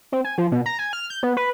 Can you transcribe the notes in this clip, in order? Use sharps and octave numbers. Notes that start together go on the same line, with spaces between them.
C4
G#5
F3
B2
A#5
G#5
F6
G6
B3
B4